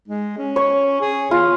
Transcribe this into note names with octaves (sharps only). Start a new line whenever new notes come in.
G#3
C#4
C#5
G#4
E2 F4